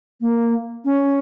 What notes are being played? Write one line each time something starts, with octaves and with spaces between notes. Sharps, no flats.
A#3
C#4